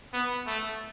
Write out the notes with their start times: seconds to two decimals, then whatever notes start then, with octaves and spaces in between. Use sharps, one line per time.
0.14 B3
0.47 A3